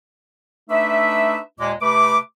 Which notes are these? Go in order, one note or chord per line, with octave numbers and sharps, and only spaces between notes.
A3 D4 D#4 B4 E5
D#2 A#2 G#3 D6
C3 A3 B4 B5 D6